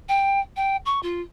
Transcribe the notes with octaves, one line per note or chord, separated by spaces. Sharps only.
G5
G5
C#6
F4